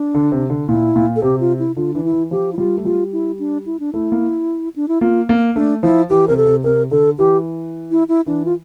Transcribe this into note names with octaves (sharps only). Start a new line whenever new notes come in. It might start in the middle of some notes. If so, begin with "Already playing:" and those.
Already playing: D4
D3
C3
D3
A#2 E4
A#2
A4
C3 G4
F4
E4
D3 F4
E3 D4
E4
E3
F3 G4
E4
G3 F4
A3
G3 F4
E4
D4
E4
D4
A3 E4
A#3
D4
E4
A#3 F4
A#3
A3 D4
F3 E4
E3 G4
C3 A#4
A4
C3
C3 A#4
D3 A4
E3 G4
E4
E4
E3 D4
F4